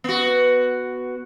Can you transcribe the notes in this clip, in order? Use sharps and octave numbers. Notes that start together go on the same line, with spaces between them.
B3 F#4